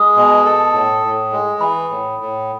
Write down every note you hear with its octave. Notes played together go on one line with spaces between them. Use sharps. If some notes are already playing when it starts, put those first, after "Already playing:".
Already playing: G#3 D#6
B2
A4
A2
A2
G#3
E3 B5
A2
A2